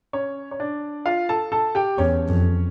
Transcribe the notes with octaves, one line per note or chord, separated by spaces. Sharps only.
C#4 C#5
C#5
D4 D5
F4 F5
A4 A5
A4 A5
G4 G5
E2 C#4 C#5
F2